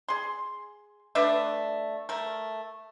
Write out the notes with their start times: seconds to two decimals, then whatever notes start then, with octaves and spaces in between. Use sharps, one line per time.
0.08 G#4 C6
1.15 A3 D4 B4 E5
2.09 A3 A#4